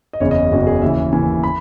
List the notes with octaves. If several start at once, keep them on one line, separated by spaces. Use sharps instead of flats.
D#5
F#1 E2 C#3 C#5
D#5
F#1 E2 C#3 F#4
G#4
D#2 C#3 E3 E5
D#2 C#3 E3 G#5
B5